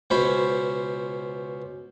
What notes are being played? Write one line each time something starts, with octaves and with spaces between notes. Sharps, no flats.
C#2 B2 C#4 C5 B5